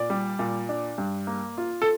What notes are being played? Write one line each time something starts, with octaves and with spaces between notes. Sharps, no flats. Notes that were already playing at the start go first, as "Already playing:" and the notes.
Already playing: A#2 D5
G3
A#2
D4
G2
A#3
F4
A4